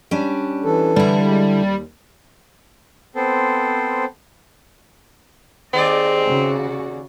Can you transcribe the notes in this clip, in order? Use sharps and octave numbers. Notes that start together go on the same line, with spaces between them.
G3 C#4 D4
E3 A4
D3 G3 E4
G#3 G4
D#2
B3 C4 A4 C5
D#2 C4 G#4 D5 D#5
C#3 F#4